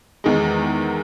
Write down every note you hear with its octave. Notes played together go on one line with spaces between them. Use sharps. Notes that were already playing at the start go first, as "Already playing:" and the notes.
E2 D#3 G#3